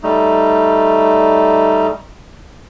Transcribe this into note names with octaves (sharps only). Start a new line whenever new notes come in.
G3 A3 D#4